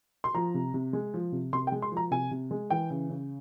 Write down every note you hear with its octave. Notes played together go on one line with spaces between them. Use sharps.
C6
F3 A#5
C3
C3
G#3
F3
C3
C3 C6
G5
G#3
C6
F3 A#5
C3 G#5
C3
G#3
E3 G5
C#3
C#3